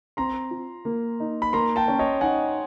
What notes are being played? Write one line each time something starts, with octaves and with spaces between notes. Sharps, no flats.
C4 A#5 C6
F4
A#3
D#4
B5
A#3 A#5 C6
G5 A5
C#4
C#5 D#5
D#4 F#5 G#5